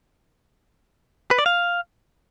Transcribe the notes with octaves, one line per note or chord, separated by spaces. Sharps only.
B4
D5
F5